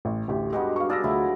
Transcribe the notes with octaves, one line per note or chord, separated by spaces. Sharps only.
A1
A1 D2 G4
G2 B2 G#3 G4 D#5 F#5
F5 C#6
D4 G#4 D5 F5 E6 A#6
D2 F#3 G#3 E4